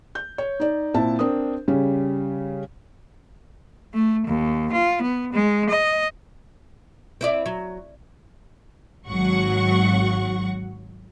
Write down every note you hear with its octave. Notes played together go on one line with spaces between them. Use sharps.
G6
C#5
D#4 D5
A#2 C4 E4 A5
C4 D4 A#4 D#6
C#3 G3 C#4
A3
D#2
F4
B3
G#3
D#5
C4 E4 D5
F#3
G#1 F#3 F#4 F#5 C#6